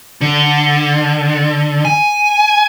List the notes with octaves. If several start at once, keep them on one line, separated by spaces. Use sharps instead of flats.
D3
G#5